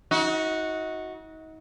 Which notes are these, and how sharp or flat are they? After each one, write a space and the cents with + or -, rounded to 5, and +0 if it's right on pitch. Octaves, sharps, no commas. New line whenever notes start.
D#4 +35 F#4 -5